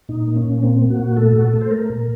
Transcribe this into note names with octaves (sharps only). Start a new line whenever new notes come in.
A#2 D#4
A#3
C#4
A#2
A#3 C4
A#3
F#4
A#2
A3 A4
A#2 F#4
A4
A3
C5
A3 A#4
A#2